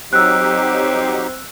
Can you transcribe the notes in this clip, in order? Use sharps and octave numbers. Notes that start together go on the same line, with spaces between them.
F#3 C4 D#4 G4 E6 F#6